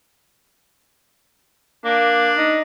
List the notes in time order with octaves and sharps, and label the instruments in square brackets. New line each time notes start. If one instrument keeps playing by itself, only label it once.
[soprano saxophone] A#3 [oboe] D4
[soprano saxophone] D#4